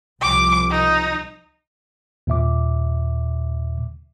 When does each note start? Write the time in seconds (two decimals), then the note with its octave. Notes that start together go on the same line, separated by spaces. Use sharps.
0.21 C2 F3 D6
0.70 D#4
2.27 D#2 A#2 E5 D6